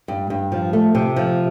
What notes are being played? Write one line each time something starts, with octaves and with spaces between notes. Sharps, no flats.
G2
G2
F3
A3
C3
F3